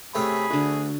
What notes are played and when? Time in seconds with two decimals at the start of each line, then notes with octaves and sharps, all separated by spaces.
0.15 C3 A3 C#4 G#4 B5
0.50 D2 D3 F#4